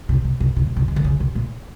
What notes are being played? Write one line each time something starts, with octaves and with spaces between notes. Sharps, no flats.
C3
C3
C3
C3
B2
C3
D#3
D3
C#3
C3
A#2